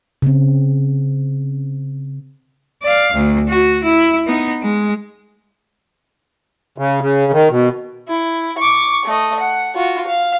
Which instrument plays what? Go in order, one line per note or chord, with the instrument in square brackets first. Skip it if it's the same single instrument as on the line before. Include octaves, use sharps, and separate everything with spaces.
[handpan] C#3 C4
[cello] D5 F5
D2
F#4
E4
B3 D#4
G#3
[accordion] C#3
C#3
D#3
B2
[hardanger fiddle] E4
C#6 D6
A3 D#5
F#5
F4 F#4
F5